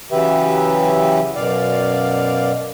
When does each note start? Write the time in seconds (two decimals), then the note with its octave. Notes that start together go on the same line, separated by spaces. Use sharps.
0.12 C#3 E3 F#3 G4 B4 E5
1.36 F#2 B2 D5 F5